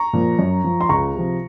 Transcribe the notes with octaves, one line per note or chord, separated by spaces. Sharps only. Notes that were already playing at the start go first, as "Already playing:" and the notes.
Already playing: A#5 C#6
A#2 F3
F#2
F3
C6
C#2 A#5 C#6
C3 F3